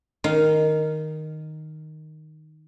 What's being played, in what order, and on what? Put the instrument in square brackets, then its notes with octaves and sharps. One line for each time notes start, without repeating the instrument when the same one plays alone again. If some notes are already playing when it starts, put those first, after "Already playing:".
[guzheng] D#3 D#4 F5